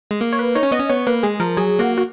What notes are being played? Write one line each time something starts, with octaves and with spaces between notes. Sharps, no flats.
G#3
A#3
C#5
B4
D#4 C#5
C#4
B3 D#5
C#4
B3 C#5
A#3 B4
G#3 G#4
F3 A#4
F#3 G#4
A#3 F#4
F#4